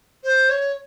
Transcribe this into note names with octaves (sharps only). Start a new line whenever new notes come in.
C5
C#5